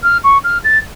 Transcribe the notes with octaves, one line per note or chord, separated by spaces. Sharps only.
F6
C#6
F6
A6